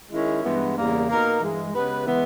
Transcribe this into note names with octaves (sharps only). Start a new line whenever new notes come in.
D#3 G#3 C#4 E4
G2 E3 G#3 B3
E2 C#3 G3 A#3
B2 A#3 D#4 A#4
G2 E3 G#3
C#3 G#3 B3 G4 B4
E3 G#3 B3